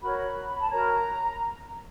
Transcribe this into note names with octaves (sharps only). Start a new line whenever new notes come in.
F#4 A#4 C#5 B5
A5
F#4 A#4 C#5 A#5